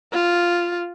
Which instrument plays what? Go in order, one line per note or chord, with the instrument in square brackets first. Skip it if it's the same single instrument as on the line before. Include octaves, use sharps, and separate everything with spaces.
[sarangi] F4